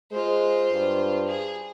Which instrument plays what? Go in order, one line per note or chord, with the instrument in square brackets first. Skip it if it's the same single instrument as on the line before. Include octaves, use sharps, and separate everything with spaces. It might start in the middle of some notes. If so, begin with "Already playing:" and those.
[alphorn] G#3 [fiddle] F4 C5
[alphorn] G2
[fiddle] G#4